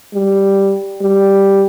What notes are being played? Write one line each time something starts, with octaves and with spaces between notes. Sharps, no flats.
G3
G3